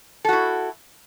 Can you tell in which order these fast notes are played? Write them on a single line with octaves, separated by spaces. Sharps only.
A4 F#4 E4